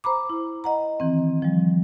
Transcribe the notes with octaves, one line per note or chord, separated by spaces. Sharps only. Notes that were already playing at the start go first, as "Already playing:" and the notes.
C5 A#5 B5 D6
E4
D#5 F#5 A#5
D#3 E3 C4
F3 G3